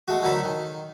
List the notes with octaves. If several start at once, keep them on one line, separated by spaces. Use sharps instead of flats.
G#3 A3 F#4
D2 D3 D#3 F#3 A4 B5
D#3